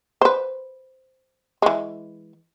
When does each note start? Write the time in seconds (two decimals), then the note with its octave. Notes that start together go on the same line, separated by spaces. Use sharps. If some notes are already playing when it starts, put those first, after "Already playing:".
0.21 B4 C5
1.62 E3 G#3